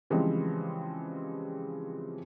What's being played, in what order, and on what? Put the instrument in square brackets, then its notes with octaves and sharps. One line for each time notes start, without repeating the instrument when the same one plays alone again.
[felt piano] C#3 E3 F3 G3 G#3 C4